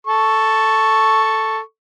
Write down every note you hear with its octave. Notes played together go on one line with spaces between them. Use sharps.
A4 C#6